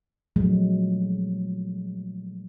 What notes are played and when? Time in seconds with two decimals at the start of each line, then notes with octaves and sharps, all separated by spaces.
0.36 A#2 F3 F#3 G#3 A3